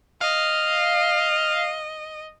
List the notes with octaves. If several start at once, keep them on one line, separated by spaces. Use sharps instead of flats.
D#5 F5